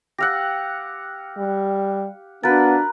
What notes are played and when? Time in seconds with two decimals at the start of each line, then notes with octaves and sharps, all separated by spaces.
0.18 G4 F5 F#5 E6 A#6
1.38 G3
2.44 B3 D4 F#4 A#4 B4 F5 A6